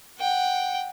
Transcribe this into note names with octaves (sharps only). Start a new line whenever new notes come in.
F#5 G5